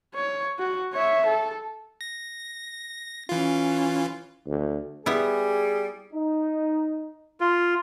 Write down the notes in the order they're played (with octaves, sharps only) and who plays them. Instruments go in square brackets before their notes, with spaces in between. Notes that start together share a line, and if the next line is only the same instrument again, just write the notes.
[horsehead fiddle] C#5
F#4
C#5 E5
A4
[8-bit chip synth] A#6
[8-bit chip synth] E3 F4 [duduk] C#4
[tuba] D2
[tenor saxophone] G3 [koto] B3 E4 [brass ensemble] G#4
[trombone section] D#4
[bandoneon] F4